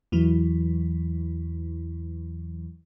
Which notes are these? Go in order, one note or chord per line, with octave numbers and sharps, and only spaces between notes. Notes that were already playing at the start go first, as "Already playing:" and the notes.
E2 E3 F#3 E4